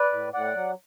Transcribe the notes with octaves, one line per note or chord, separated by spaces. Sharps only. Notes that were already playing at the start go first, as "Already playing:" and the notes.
Already playing: B4 D5
A2
A2 D5 F#5
F#3